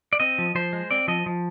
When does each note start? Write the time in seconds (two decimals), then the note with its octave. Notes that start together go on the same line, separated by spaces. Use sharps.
0.13 D5
0.20 C4 D#5
0.38 F3
0.55 F3 C5
0.73 G#3
0.91 C4 D5
1.08 F3 D#5
1.26 F3